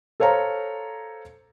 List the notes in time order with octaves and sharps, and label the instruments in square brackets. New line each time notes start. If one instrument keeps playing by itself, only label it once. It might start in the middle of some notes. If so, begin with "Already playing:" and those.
[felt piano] A4 C5 C#5 F5 A#5